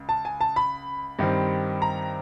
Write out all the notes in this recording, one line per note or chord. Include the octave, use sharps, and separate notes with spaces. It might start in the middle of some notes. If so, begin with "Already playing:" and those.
Already playing: C#2
A5
G#5
A5
B5
G2 D#3 G3 C4
A#5